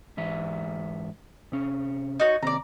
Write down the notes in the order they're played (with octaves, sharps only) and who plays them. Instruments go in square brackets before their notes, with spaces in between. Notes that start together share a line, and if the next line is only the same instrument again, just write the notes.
[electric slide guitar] G#2 E3 E5
C3 C#4
[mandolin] D#4 F#4 C#5
[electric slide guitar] C3 D#3 C4 [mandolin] D5 A#5